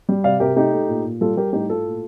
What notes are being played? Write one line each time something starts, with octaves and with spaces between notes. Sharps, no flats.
G3
C3 D5 F5
C3 G4 A#4
A3 D#4 G4
A3
A#2
A#2
G3 F4 A4
G3 G4 A#4
A2 D#4 G4
A2 F4 A4
A#2